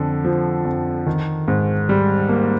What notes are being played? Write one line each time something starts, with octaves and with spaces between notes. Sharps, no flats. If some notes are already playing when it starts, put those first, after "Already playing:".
Already playing: F2 D3
F3
F2
D#3
G#2
G3
A#3